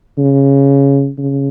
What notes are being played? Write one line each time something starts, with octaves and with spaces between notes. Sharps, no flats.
C#3
C#3